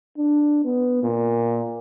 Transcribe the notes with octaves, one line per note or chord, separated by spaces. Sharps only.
D4
B3
A#2